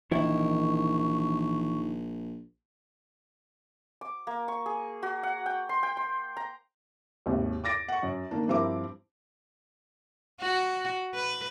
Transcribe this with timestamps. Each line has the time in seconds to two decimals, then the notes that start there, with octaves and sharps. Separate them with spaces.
0.11 A#1 D#3 E3 E4 C#6
4.01 D6
4.27 A#3
4.48 C#6
4.66 G#4
5.03 F#4
5.23 F#5
5.46 G5
5.69 C6
5.83 G5
5.97 C6
6.37 A#5
7.26 G#1 D#2 C3
7.64 D6 A6 A#6 D7
7.88 F#5 C#6
8.03 F#2
8.31 D#3 A#3 D4
8.48 G2 F3 C4 E4 A#4 D6
10.41 F#4
11.15 B4